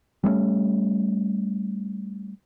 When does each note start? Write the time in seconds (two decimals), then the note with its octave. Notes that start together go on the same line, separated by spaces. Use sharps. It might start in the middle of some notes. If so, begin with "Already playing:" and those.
0.24 G3 A3 B3 C#4